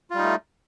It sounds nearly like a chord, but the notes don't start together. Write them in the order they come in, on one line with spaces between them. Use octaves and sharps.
F4 G3 D#4 A3